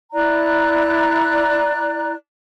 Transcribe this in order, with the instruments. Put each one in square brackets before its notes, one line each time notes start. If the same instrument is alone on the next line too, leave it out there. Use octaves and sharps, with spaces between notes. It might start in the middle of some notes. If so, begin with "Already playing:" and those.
[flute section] E4 D5 A#5 F#6